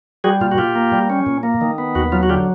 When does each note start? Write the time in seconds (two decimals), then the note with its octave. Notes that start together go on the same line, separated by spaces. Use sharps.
0.24 G3 F#4 G#4
0.41 A#2 F4
0.52 F#4
0.58 A#2 F4 G4
0.75 A#3
0.92 G3
1.10 C#4
1.26 A#2
1.43 A#3
1.61 D#3
1.78 B3
1.95 D#2 F#4
2.12 F#3 F4
2.23 F#4
2.29 D3 F4 G4